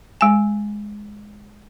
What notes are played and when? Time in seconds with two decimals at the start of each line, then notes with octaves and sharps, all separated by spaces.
0.21 G#3 G#5